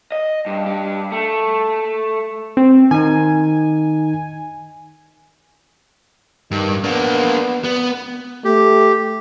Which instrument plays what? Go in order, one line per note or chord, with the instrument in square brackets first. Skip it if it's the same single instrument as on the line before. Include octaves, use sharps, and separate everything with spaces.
[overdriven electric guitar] D#5
G2
G2 G4
A3
[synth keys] C4
[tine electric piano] D#3 D#4 [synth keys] G#5
[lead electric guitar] G2 [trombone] D#3
[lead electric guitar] A#3 D4 [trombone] B3
[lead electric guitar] B3
[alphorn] A3 [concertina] G4